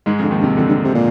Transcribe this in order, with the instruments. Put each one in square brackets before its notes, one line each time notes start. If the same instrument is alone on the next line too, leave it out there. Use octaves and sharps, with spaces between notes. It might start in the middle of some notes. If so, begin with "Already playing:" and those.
[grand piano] G#2 G#3 [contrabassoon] D#3
[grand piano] F2 F3 [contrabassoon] D3
[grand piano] D#2 D#3
[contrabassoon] G2
[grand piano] C3
[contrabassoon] F2 [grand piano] D3
[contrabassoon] G2
C3
A#2